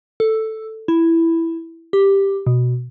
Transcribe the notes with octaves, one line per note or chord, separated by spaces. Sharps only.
A4
E4
G4
B2